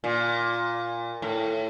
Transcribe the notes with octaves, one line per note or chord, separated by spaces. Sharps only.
A#2
A2